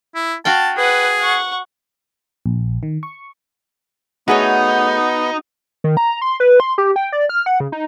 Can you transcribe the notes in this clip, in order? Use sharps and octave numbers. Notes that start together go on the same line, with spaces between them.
E4
F#4 F5 G5 A5
G#4 B4 F#5
F#5 C#6
A#1
D#3
C#6
A3 B3 D#4 F#4 G#4 C#5
D#3
A#5
C6
B4
C6
G4
G5
D5
F6
F#5
C#3
D#4